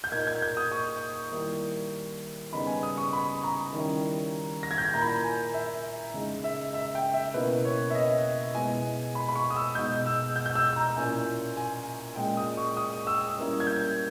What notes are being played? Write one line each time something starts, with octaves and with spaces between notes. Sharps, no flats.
G6
A#2 A#3 D#4 G#6
G#6
G6
D#6
C#6
D#3 G3 A#3 E4
C#3 G3 B3 D#4 B5
G#5
D#6
C#6
B5
A#5
D#3 G3 C#4 E4
A#6
G#6
G6
G#6
A#2 A#3 E4 A#5
B5
A#5
G#5
E5
C#3 G#3 D#4
E5
E5
G5
E5
B2 A#3 C#4 E4 B4
C#5
E5
D#5
B2 G#3 B3 E4 G#5
B5
B5
C#6
D#6
E6
B2 G#3 D#4 G6
E6
G6
G6
E6
A#5
A#2 A#3 C#4 E4 G#5
G#5
A#2 G#3 C#4 G5
D#6
C#6
D#6
E6
G3 A#3 C#4 E4
G#6
G6